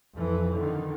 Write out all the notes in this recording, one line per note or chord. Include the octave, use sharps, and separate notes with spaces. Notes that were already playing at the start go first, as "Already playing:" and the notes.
F2 E3
D3 D#3